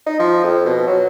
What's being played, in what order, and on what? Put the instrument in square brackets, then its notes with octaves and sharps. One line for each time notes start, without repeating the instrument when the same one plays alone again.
[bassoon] D#4
F3
F2
B2
F#3